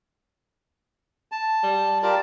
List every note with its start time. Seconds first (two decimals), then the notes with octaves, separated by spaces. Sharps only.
1.32 A5
1.63 G3
2.03 F4 G4 A#4 D5